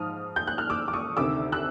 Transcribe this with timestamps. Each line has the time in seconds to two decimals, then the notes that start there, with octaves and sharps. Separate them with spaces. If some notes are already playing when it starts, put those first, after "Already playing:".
Already playing: G#2 F3 D#6 F6
0.36 G6
0.47 F#6
0.58 F6
0.70 D6 E6
0.88 D6
0.93 C#6 D#6
1.17 D2 C3 D#3 D6 E6
1.52 E6 F#6